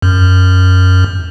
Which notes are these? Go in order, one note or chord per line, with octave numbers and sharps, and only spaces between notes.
F#2